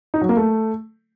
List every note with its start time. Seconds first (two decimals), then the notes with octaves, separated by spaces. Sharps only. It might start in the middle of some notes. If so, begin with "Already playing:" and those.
0.14 D#4
0.21 F#3
0.29 A#3
0.37 A3